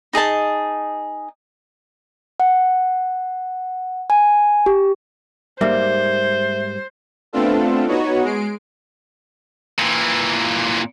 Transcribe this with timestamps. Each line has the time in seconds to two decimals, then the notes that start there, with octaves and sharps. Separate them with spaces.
0.13 D#4 G#4 D#5 A5
2.40 F#5
4.10 G#5
4.66 G4
5.61 G#2 G3 A#3 C5 E5
7.33 A3 B3 C4 D4 F4 A4
7.88 B3 D#4 F#4 C#5
8.22 G#3 C7 D7
9.79 A#2 E3